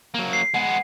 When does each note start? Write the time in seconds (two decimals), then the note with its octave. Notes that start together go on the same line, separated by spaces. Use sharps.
0.14 F#3 A#3
0.33 C7
0.54 G#3 B3 F#5